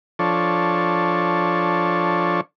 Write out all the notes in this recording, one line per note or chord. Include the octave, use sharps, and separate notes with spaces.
F3 D4 A4 C#5